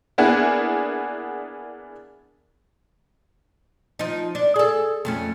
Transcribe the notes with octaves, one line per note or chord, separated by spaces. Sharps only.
A#3 B3 D4 E4 G#4 F#5
F3 D#4
D4
G#4 A4
F2 A3 C#4